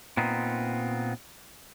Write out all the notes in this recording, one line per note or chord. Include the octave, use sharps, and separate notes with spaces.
A#2 B3 C4 D#4